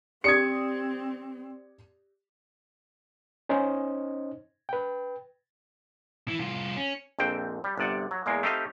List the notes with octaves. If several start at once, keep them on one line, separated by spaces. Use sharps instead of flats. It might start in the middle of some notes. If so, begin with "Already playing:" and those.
C4 G4 D5 D#6 G#6 C#7
C#4 D#4 C5 D#5
B4 G5
E3
C2 F4
C#4
A#1 F2 C4 G5
G3
G1 C3 D5 F#5
F#3
E2 G#3 A#3
A3 C4 D#4 G4 D#5 F5